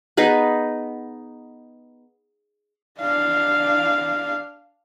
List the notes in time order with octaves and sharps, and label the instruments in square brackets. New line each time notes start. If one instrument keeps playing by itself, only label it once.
[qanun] B3 D#4 G#4 B4
[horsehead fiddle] D4 F5